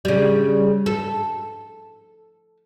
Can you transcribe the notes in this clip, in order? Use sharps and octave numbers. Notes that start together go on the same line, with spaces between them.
C#3 G3
A4